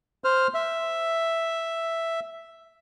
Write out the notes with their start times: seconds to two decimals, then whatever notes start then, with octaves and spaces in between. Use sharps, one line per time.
0.24 C5 F6
0.54 E5